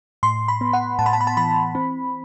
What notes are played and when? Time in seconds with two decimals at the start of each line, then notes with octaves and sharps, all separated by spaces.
0.23 A2 C6
0.48 B5
0.61 B3
0.73 F#5
0.99 A2 A5
1.06 B5
1.13 A5
1.21 B5
1.27 A5
1.37 E3 B5
1.75 C4